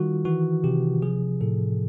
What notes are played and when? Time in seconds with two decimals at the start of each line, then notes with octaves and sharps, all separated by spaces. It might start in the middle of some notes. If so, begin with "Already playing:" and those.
Already playing: D#3 G3 F4 F#4
0.25 E3 F#4
0.64 C3 G4
1.02 F3 G#4
1.41 A2 A4